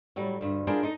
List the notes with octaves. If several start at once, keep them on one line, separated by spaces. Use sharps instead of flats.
A2 F#3 G3
D2 G2
D4 E4 F4 G#4 A#4 C5
D#4 A4 D#5